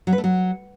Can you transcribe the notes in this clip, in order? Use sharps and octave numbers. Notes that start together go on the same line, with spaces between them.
F#3
B4
A3
F#3